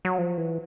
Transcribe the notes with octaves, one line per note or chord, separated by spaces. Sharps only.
F#3
F3
E3